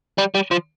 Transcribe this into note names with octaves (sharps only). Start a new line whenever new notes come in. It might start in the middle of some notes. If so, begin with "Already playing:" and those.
G3
G3
F3